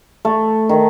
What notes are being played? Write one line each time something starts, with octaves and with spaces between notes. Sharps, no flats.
A3
D#3